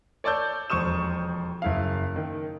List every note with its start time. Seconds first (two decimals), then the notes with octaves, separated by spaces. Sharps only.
0.24 C#5 D5 A5 E6 G6
0.70 E1 F2 C5 C#6 D#6 E7
1.62 F#1 E4 F5
2.16 D#3